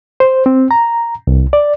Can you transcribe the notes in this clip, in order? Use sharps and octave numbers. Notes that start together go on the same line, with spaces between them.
C5
C4
A#5
C2
D5